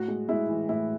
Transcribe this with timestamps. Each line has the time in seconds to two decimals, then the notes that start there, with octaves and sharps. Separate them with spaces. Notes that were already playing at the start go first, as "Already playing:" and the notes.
Already playing: A2 F#4
0.08 G#3
0.29 G#3 E4
0.49 E3
0.69 A2 E4